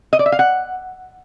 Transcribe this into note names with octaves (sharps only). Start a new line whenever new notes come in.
D#5
D5
E5
F5
F#5